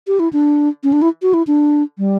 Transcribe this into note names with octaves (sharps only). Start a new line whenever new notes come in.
G4
E4
D4
C#4
D4
E4
F#4
E4
D4
G3